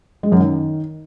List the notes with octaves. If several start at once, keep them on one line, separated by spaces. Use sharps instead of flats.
G#3
F#2
D#3